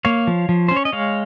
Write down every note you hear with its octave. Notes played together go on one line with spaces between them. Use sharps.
A#3 C#5 F5
F3
F3
C#4 C5
C#5
D#5
G#3 C#5 F5